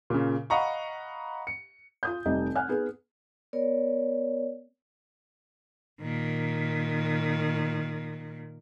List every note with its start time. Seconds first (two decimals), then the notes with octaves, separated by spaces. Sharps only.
0.10 A#2 C#3
0.50 D#5 F5 F#5 A#5 B5 C#6
1.47 C#7
2.03 F4 D#6 G6
2.25 F1 G3 D#4 D#5
2.56 F#5 G#5 F6 F#6
2.68 B3 D#4 G#4 B4
3.53 B3 A#4 C#5 D5
6.01 A#2 D#3